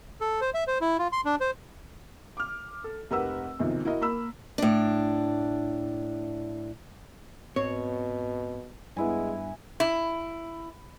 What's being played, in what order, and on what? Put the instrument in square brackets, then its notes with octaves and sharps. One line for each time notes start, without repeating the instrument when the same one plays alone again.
[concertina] A4
C5
E5
C5
E4
F4
C6
D4
C5
[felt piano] D6 F6
A4
F1 G4 A#4 B4 F#5 E6
B1 C3 D#3 F3
E4 F#4 A#4 D#5 E5
A#3 A#4 B5 E6
[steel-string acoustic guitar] A2 D4
[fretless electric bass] G#2 C4 [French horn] B2 [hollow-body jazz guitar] C#5
[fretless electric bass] G2 [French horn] G#3 [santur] B3 E4 G#5
[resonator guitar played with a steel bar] E4